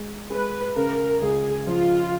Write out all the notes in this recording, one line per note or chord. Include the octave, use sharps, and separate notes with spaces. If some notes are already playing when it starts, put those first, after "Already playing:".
Already playing: G#3
G#3 B4
C#3 A#4
C#2 G#4
F3 F4